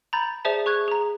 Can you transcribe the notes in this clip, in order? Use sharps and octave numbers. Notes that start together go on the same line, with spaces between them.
A#5 B5 G6 A6
G#4 C5 D5 E5 A5
G#4 C#6 F#6 G#6
G#4 A#5